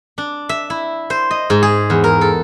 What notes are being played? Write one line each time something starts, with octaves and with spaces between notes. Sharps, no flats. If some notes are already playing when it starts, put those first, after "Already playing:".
D4
E5
E4
C5
D#5
G#2
G#4
E2
A#4
A4